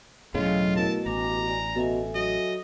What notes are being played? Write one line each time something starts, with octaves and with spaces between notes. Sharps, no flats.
E1 A2 C#3 F#3 F4 D#5
B2 A3 E4 A#4 A5
A1 G#5 A#5 D6
D5 G#5
B2 A4 E5 G#5
F#3 D#5